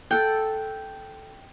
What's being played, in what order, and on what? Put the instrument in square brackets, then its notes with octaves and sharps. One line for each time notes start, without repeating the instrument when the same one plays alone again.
[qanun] A4 F#5 [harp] G5